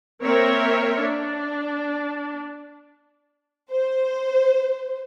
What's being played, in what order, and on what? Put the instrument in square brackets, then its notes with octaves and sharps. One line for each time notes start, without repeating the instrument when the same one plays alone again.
[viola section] A#3 C4 A#4 C#5 E5
D4
[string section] C5